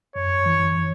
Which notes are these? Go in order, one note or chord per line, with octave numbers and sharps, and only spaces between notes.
F#2 C#5
E3